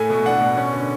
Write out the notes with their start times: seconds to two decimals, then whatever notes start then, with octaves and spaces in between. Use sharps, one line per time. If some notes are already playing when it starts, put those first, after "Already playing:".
Already playing: A2 A3 G#5
0.10 B2
0.26 D4 F#5
0.41 B2
0.57 C#4
0.73 D3